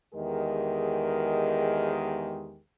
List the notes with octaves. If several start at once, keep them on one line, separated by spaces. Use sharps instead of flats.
E2 D#3 G#3 G4 G#4 A#4